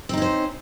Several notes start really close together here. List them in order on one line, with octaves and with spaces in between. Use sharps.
C4 D#4 C#4 C5